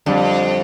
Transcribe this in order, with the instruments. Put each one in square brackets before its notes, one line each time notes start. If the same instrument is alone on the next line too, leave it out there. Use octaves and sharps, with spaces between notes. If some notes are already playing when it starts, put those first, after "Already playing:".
[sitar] F2 [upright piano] D3 G3 D4